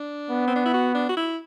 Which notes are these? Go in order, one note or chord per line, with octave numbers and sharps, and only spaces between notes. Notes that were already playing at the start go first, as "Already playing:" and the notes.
Already playing: D4
B3
C4
D4
E4
F#4
D4
F#4
E4